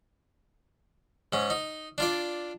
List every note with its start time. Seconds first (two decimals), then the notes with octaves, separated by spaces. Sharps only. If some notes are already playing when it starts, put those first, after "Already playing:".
1.33 G#2 C#4
1.50 D#4
1.98 D4 F4 D5